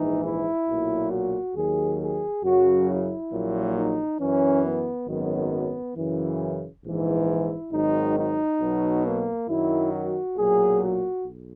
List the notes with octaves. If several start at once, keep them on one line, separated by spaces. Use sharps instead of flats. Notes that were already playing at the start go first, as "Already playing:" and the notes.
Already playing: A#1 G#2 E3 D#4
E4
B1 A#2 F#3
F#4
D#2 D#3 F#3 G#4
G#4
F#2 C#3 F#3 F#4
E4
A#1 A#2 F#3
D#4
F#2 E3 C#4
B3
G#1 F#2 D#3 F#3 B3
F#2 C#3 E3
A#1 G#2 E3
E4
G#1 G#2 D#3 F#3 D#4
D#4
B1 B2 F#3
A#3
F#2 D#3 F#3 E4
F#4
B1 A#2 F#3 G#4
F#4
B1